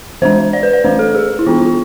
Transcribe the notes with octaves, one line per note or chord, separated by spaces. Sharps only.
E3 G#3 D4 C5
D5
B4
D5
E3 A3 D4 C5
A4
G#4
E4
E3 B3 D4 F4
F4